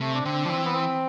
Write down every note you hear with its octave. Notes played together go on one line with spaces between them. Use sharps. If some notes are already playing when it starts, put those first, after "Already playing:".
C3 A3
D4
D3 C4
F3 D4
E3 C4
B3
C4